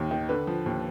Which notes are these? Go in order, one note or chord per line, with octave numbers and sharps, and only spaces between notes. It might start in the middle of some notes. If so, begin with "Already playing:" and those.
Already playing: D#2 D#3
D#3
D3 B4
F3
D#2